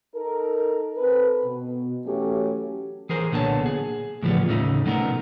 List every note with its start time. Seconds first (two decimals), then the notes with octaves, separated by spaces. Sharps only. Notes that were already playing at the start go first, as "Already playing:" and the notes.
0.15 D#4 A4 A#4
0.97 C4 A4 B4
1.45 B2
2.06 E3 F#3 A3 C#4 G4
3.09 E3 G#4 A#4 C5
3.32 B1 A#2 D3 B3 C#5 A5
3.66 G#4
4.23 A2 C#3 E3 F3 G3 B3
4.48 D#2 A2 C#3 A3 D#4
4.85 B2 F#3 A3 B3 D#4 A#4